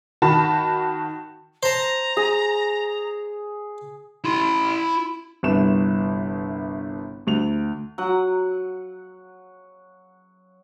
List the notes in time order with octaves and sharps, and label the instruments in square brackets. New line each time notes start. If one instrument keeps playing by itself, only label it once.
[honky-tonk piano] D#3 F#4 A5 B5
[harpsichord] C5 A5 [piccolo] A#5
[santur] G#4
[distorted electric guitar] E4 C6
[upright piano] G1 C2 B4 E7
D2 F7
[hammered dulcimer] F#3 F#5